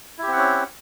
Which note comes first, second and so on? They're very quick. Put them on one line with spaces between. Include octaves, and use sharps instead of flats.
E4 G4 C4 F#5 C#4